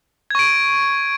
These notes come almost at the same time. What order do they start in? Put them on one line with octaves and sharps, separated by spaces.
G#6 C#6 D7